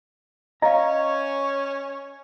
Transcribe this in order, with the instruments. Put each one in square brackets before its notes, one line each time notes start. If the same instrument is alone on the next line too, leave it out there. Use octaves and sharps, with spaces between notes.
[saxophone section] C#4 C#5 [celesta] D#5 F5 [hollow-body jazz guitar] A#5